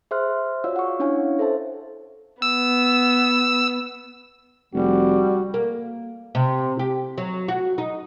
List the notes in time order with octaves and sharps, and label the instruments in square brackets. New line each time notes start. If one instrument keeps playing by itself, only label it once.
[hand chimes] G#4 C5 E5 C6 F6 F#6
F4 F#4 C#5 D5 F5 E6
F#5 C#6
C#4 D4 E4 C#5 F5 G#5
A4 C5 E5 A5
[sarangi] B3 [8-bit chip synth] E6
[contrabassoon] F1 [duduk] G3 [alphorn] F#4
[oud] A#3
C3
G4
F#3
F#4
D#4